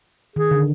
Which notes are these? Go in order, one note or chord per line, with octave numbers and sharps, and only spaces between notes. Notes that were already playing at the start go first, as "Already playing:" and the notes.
D#3 G#4
D3